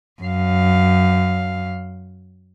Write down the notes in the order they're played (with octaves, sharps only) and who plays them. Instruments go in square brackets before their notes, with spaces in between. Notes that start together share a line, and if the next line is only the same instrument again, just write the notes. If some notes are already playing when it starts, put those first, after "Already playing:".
[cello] F#2 F5